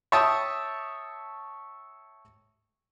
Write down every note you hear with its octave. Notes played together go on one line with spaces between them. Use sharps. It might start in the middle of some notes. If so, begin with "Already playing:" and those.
C#5 E5 G5 A5 C#6 D#6